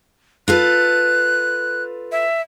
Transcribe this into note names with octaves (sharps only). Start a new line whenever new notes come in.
F4 A4 B4 F#6
E5